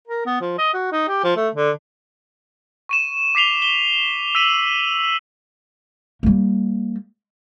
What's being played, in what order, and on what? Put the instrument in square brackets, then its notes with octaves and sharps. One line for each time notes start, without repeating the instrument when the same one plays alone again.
[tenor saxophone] A#4
B3
F3
D#5
F#4
D#4
G4
F3
A3
D3
[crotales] C#6 D#7 E7
D6 B6 C7 F7 G7
G7
E6 B6 D#7 F#7
[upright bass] G3 A#3